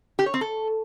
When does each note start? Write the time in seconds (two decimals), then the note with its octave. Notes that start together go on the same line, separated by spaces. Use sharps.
0.19 G4
0.26 C#5
0.34 C4
0.41 A4